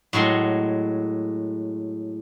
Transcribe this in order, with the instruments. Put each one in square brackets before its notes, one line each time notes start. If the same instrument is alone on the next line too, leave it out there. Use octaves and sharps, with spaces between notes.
[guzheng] A2 F#3 G#3 C6